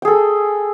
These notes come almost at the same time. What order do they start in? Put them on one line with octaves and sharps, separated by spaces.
G5 G#4 A4